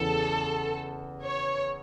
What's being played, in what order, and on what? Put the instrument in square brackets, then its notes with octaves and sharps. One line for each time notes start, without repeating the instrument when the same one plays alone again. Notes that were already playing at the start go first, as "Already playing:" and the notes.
Already playing: [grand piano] E2 C#3 E3 [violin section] A4
[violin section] C#5